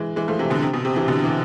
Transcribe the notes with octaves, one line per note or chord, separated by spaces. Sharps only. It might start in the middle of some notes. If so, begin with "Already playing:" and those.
Already playing: E3 G#3
E3 G#3
F3 A3
C3 E3
B2 D3
C3
B2
C3
C3 E3
B2 D3
E3